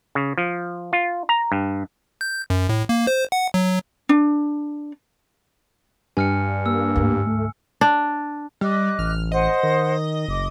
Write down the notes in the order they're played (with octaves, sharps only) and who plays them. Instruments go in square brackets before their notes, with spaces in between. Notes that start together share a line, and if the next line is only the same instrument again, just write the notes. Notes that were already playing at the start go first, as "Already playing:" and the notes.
[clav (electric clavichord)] C#3
F3
F4
A#5
G2
[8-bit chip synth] G6
F#2
A2
A#3
C5
F#5
F#3
[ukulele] D4
[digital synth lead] G2 [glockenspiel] G#5 F6 C#7
[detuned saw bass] A#3 [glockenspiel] E6
[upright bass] D2 G#2
[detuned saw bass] A3
[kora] D4
[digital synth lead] G3 [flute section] D#5 D6 F#6
[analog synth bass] A1 [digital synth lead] F6
[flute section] C5 F#5 [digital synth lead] D#5
[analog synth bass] D#3
[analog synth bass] F#1 [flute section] D6